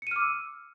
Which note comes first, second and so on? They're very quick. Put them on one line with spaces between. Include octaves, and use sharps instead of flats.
C#7 D#7 F6 D6 E6